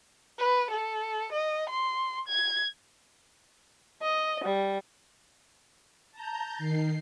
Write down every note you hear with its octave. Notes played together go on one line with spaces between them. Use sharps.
B4
A4
D#5
C6
G#6
D#5
G3
A5 A#5 G6
D#3 C7